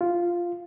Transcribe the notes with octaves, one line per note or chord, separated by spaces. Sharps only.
F4